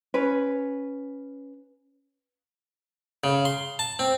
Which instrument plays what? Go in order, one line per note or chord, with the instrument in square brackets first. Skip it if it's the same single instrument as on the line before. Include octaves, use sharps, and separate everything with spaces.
[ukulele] C#4 B4
[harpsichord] C#3
C6
A5
C4